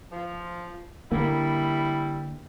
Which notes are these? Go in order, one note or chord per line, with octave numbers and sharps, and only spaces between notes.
F3
D3 G3 A#3 E4